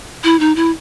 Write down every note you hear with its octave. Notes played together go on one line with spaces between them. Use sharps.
E4
D#4
E4